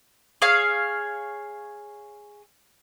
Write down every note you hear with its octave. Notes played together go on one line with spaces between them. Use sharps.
G#4 C#5 F5